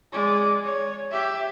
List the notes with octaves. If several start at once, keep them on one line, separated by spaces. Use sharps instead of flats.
G#3 D5
C#5
G4 E5